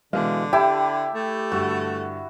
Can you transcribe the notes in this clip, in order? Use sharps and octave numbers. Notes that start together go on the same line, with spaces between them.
B2 D3 E3 G#3 F5
E4 G4 E5 G5 A5
A3
G2 D3 F#4 E6